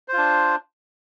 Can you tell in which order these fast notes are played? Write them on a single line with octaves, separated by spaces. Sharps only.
C5 F4 D4